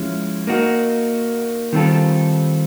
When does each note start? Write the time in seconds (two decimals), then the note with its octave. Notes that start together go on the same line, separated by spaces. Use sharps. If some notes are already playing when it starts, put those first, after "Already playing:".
Already playing: F3 G#3 C#4 E4
0.47 A#3 D#4 F#4
1.73 D#3 G3 C4 F4 A4